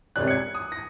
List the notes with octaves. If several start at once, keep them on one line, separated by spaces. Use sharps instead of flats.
E1 C3 C#5 D5 F#6
G#6 C#7
D#6
A#6